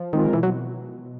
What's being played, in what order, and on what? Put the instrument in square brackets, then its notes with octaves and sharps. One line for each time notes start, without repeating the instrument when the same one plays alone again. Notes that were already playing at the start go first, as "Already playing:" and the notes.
Already playing: [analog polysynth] F3
[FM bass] D#3 [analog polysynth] G#3 C4 F4 A#4
[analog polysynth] B2 [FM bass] E3
[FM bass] F#3